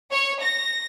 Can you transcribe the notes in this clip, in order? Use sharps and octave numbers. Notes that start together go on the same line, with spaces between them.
C#5
A#6